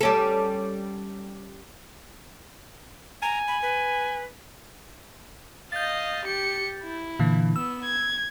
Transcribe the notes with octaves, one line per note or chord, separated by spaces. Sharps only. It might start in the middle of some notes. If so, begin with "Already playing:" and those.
G3 C#4 A4
G#5 A#5
B5
B4
D#5 F5 G6 A6
G4 C#7
E4
A#2 D3 E3
B3 E6
G#6